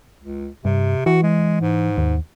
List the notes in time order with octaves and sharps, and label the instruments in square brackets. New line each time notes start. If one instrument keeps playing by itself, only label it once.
[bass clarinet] C#2
[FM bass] G2 [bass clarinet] C3
[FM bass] E3 [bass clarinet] F#4
[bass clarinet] G#3
G#2
[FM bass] D#2